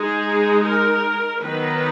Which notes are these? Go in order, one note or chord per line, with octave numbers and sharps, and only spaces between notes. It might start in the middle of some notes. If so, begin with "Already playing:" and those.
Already playing: G#3 D#4 G#4
A#4
D#3 F#3 B3 D#4 B4